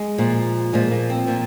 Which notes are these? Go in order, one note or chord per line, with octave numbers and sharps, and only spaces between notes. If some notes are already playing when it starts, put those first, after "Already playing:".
Already playing: G#3
A#2 F3
A#2 F3 G#3
A#3
C4
A#2 F3